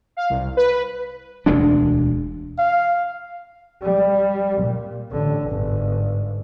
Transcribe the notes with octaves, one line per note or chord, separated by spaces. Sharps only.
F5
C2
B4
E1 D2 G#3 D4
F5
G3
A#2
A1 D3
G1 G#2